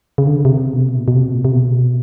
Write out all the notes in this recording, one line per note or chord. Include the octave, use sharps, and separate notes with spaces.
C#3
D3
C3
B2
C3
B2
A#2
B2
C3
A#2
C3
B2